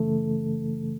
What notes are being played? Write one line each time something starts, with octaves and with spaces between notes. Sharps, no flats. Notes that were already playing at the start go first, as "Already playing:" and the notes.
Already playing: F#2 C#3 E3 A3 A4